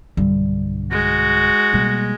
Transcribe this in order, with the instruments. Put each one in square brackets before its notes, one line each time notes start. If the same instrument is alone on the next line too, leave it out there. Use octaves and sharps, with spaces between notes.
[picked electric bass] B1 G2 D3 [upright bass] G3
[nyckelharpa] G#3 [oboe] F#4
[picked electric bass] B2 G3 [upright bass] A#3